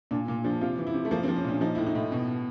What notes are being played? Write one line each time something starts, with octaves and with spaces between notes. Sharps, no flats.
A#2 D4
A#2
F3 D4
C3 F4
E3
E4
C3
A3
F3 A#3
C4
F3
C#4
A#2 D4
F3 D#4
A2 E4
D#4
A2
B2
B2